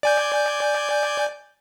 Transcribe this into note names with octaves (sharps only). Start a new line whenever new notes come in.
D5 G#5 G6